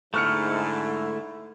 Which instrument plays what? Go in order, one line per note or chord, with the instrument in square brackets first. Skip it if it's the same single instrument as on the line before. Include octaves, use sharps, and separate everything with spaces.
[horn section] G#2 [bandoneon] D3 E4 [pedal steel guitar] A3 [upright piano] C#6 F6 C#7